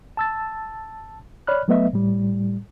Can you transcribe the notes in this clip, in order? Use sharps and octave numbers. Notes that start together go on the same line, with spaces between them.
A5 E6 A6
C#5 D5 B5 F6 F#6
F#3 A3 B3 B4 D#5 E5
A2 G3